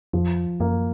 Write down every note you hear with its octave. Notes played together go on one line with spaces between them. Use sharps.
F2 F3
F#2 A#3